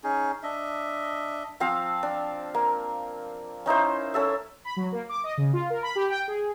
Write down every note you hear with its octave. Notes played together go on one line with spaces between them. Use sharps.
C#4 D#4 G#4
D4 D#5 E5
F3 C4 F5
D4
A#3
C#4 D#4 E4 C5
C#4 A4 E5
B5
F#3
A#3
D6
D#5
C#3
F4
A#4
B5
G4
G5
G#4